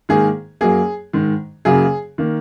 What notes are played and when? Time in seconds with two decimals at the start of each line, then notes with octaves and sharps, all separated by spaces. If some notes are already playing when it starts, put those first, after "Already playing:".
0.09 G#2 D#3 A#3 G#4
0.61 F#2 F#3 A#3 G#4
1.13 G#2 D#3 G#3
1.65 F#2 C#3 F#3 A#3 G#4
2.18 D#3 A#3